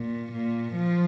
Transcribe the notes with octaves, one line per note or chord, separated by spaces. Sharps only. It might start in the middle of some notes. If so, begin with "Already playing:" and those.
Already playing: A#2
A#2
F3